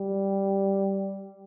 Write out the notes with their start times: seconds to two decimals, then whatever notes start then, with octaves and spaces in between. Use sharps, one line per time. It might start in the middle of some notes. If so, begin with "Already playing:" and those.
Already playing: G3